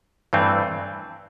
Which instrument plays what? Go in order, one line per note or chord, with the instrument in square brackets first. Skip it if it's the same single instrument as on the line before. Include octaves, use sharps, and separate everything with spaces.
[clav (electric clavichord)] G2 E3 A3 C4